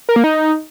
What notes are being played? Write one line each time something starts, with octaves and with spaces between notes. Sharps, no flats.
A#4
A#3
D#4